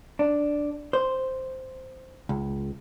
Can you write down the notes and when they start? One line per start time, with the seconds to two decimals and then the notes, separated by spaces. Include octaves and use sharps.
0.19 D4
0.93 C5
2.29 C#2